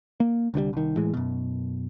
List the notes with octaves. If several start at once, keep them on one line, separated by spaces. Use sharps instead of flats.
A#3
C2 D3 D#3 G3
C2 D#3
A2 E3 G#3
F#2 B2